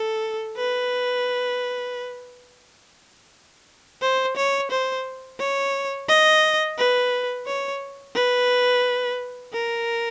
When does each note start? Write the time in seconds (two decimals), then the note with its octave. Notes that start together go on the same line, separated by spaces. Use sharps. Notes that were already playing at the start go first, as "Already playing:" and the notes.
Already playing: A4
0.57 B4
4.02 C5
4.36 C#5
4.71 C5
5.39 C#5
6.08 D#5
6.78 B4
7.46 C#5
8.15 B4
9.53 A#4